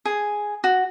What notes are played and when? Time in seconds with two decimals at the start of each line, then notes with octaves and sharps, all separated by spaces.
0.05 G#4
0.64 F#4